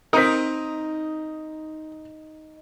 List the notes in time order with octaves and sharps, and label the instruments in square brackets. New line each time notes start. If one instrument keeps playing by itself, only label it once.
[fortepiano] C4 A#4 [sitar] D#4 [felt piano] D#6 B6